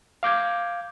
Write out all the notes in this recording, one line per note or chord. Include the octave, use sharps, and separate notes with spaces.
F5 D6 G6 G#6